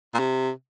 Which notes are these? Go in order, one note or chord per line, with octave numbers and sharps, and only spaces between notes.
A#2
C3